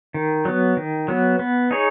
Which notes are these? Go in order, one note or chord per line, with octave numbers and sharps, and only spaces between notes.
D#3
F#3 B3
D#3
F#3 B3
B3
D#4 G#4 C#5